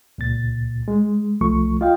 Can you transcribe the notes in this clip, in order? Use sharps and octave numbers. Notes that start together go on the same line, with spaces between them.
C#2 A#2 A6
G#3
C2 F3 A3 C#6
F4 D#5 F5 G5